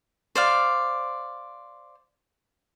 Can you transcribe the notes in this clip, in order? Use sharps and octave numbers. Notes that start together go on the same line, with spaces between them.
C5 D5 F5